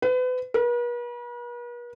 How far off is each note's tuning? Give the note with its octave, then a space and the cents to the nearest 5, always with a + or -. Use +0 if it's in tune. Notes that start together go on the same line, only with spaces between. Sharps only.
B4 +35
B4 -45